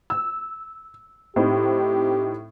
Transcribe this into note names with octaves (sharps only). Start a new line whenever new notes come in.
E6
A2 C4 D#4 G4